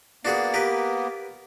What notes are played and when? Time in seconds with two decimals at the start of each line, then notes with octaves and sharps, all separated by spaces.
0.25 A#3 B3 D4 F#4 G#4
0.54 G4 A#4 B4